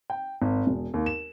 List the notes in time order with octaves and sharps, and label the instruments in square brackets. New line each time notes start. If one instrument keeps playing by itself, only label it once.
[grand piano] G5
G#1
E1
D#2
E7